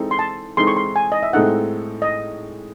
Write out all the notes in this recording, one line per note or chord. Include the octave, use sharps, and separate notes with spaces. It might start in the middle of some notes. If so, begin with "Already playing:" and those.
Already playing: E3 G#3 C4 D#4 A4
C6
A5
E3 G#3 C4 D#4 A4 C6
C#6
C6
G#5
D#5
E5
A2 G#3 C4 D#4 A4 F#5
D#5